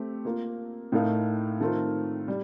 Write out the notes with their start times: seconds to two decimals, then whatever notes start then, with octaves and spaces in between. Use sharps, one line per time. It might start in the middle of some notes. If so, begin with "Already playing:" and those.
Already playing: A3 C4 G4
0.25 A#3 F4 A#4
0.92 A2 A3 D#4 A#4 F5
1.60 D#3 A3 C4 F4 A#4
2.28 G3